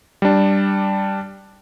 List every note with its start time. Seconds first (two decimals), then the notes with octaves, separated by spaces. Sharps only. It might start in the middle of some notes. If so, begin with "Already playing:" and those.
0.22 G3 D4